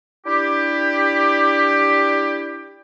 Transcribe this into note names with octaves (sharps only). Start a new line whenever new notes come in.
D4 E4 G4